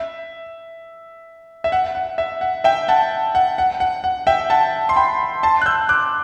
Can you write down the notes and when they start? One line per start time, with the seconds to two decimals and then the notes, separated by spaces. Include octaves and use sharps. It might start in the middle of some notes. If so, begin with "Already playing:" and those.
Already playing: E5
1.64 E5
1.72 F#5
1.95 F#5
2.18 E5
2.41 F#5
2.64 E5 G5
2.88 F#5 A5
3.35 F#5
3.58 F#5
3.80 F#5
4.04 F#5
4.27 E5 G5
4.50 F#5 A5
4.89 C6
4.96 G5 B5
5.43 A5 C6
5.62 F#6
5.66 E6 G6
5.89 D6 F#6